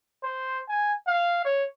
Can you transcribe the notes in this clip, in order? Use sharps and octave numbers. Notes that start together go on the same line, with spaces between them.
C5
G#5
F5
C#5